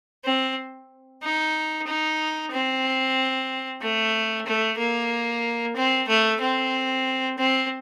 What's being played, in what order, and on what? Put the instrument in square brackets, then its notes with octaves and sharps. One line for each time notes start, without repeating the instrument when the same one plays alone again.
[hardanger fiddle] C4
D#4
D#4
C4
A3
A3
A#3
C4
A3
C4
C4